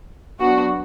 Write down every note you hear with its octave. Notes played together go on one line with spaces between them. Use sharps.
F#3 B3 D4 F#4